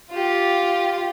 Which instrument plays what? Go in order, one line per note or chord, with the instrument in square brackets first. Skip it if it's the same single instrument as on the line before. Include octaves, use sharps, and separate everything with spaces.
[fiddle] F4 G4